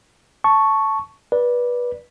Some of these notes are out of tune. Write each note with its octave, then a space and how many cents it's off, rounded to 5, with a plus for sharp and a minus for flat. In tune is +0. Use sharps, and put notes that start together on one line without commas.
A5 +0 C#6 +0
B4 -20 D5 +0